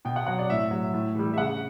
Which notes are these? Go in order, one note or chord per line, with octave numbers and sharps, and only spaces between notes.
B2 G5
F#5
F#3 F#5
D5
A2 E5
F#3
A2
E3 G3
E5
C#3 F#5